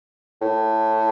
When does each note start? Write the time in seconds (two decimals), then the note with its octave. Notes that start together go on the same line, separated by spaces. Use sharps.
0.42 A2